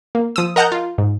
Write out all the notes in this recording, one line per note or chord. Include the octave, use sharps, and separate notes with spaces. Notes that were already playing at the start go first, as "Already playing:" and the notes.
A#3
F3 D#6 E6
A#4 D#5 F#5 A5 A#5 G6
F4
G#2